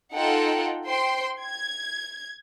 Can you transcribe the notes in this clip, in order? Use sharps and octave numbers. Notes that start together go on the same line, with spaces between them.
D#4 F4 A4 F#5 G5
C5 G5 C6
G#6